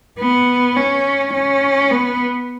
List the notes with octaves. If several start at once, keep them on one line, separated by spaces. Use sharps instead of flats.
B3
C#4
C#4
B3